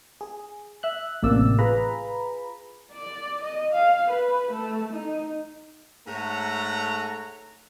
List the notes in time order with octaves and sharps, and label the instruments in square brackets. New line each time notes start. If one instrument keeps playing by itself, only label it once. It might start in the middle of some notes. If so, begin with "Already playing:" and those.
[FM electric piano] G#4
E5 F#6
A1 C3 A#3 D5 E6
F4 G#4 B4 A#5 B5
[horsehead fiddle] D5
D#5
F5
B4
A3
D#4
[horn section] G#2 A3 A4 C#5 F#5 A#5